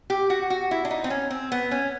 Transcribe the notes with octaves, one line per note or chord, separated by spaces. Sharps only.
G4
F#4
F#4
E4
D4
D#4
C4
C#4
C4
B3
C#4